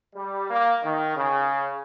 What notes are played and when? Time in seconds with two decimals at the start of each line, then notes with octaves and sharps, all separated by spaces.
0.15 G3
0.50 A#3
0.83 D#3
1.16 C#3